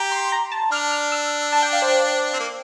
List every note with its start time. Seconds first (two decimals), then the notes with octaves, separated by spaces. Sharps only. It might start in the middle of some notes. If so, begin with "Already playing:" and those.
Already playing: G4 A#5
0.12 C6
0.32 A#5
0.52 A5
0.72 D4 F6
0.91 F6
1.12 E6
1.53 A5
1.62 G5
1.73 F5
1.82 C5
2.33 C4
2.40 A#3